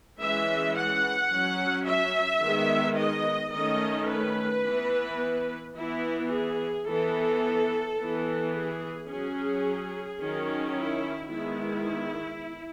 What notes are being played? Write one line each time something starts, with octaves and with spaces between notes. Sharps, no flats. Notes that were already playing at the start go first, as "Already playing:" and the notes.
E3 G#3 C#4 E5
F#5
F#3 C#4
E5
D#3 G#3 B3
D#5
D#3 A3 C#4 D#5
B4
E3 B3
E3 B3 E4
G#4
E3 B3 A4
E3 B3
G#4
F#3 C#4 G#4
D#3 F#3 C#4
E4
D#3 G#3 B3 E4